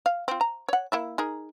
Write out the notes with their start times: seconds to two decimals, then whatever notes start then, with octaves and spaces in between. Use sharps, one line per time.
0.06 F5
0.28 C4 F4
0.41 A#5
0.69 C#5 F#5
0.92 A#3 E4 E5
1.18 D#4 G#4 A#4